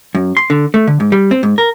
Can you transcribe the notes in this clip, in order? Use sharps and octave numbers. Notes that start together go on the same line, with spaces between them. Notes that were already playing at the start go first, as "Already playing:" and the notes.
F#2
C6
D3
A3
D3
G#2
G3
C4
G#2
A#4